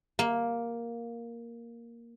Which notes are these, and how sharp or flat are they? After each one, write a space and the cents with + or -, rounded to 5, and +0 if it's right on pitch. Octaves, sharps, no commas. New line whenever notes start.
A#3 +5